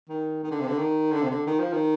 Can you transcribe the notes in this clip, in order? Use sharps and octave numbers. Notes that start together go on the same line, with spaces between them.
D#3
D#3
D3
C3
D3
D#3
D3
C3
D3
D#3
F3
D#3